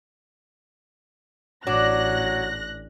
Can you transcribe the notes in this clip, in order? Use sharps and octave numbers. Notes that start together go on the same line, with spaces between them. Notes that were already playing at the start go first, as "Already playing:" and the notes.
A1 F#3 D4 F#6 A#6